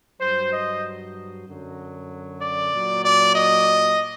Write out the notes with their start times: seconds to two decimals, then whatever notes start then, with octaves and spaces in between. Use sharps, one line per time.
0.19 G2 F#3 C5
0.51 D#5
1.46 F#2 D3 F#3
2.41 D5
2.73 A#2 F#3
3.04 D5
3.35 D#5